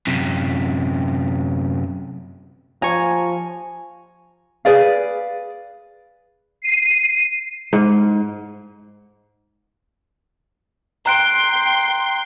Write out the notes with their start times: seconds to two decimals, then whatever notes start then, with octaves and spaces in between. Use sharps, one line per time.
0.07 F#2 C3
2.82 F3 G#5 A#5 C#6
4.65 G#4 B4 D5 F5
6.62 C7 D#7
7.73 G#2
11.06 G5 A#5 C6 F#6 D7